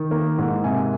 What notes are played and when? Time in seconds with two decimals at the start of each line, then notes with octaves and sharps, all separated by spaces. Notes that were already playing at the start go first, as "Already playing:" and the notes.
Already playing: D#3
0.11 A#3
0.38 G#2
0.64 C3 G#5